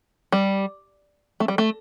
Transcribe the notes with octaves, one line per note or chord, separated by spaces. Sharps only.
G3
A3
G3
A3